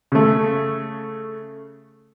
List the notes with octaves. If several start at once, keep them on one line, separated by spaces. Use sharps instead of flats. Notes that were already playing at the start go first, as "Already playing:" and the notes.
C#3 A3